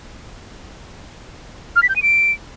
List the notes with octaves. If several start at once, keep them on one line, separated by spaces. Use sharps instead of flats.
F6
B6
G6
D#7
D7